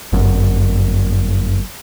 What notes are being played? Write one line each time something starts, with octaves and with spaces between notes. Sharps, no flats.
G1 F#2